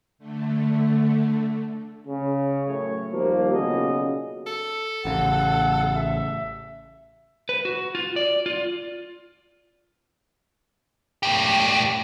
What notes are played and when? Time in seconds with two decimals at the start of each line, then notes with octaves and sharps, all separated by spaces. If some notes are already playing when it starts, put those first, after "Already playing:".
0.19 D3 A3
2.07 C#3
2.66 F#2 A2 C#5
3.12 D#2 F3 G3 A#3
3.53 B1 A#2 C#3 F#4 D#5
4.47 A4
5.05 A1 C#3 F#5
5.94 E5
7.49 B4
7.65 F#4
7.95 F4
8.16 D5
8.46 F4
11.23 A2 G4